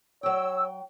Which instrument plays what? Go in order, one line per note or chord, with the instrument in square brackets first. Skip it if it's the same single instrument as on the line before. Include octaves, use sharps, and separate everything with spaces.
[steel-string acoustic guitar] F#3 G5 [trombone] C#5 [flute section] E6